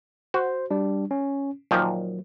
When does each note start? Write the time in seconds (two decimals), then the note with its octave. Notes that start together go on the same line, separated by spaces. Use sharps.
0.34 F#4 C5
0.71 G3 D4
1.11 C#4
1.71 A#2 D#3 F3 F#3